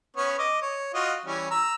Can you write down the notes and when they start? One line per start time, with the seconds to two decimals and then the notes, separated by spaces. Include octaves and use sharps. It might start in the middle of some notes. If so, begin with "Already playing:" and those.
0.16 B3 C#4 C#5
0.39 D#5 D6
0.62 C#5
0.94 F4 F#4 D#5
1.26 E3 G3 C#4
1.51 A#5 E6